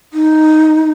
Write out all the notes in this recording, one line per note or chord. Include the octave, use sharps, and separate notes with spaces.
D#4